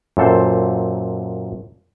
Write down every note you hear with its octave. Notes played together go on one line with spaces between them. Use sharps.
F#2 A#2 A4 C5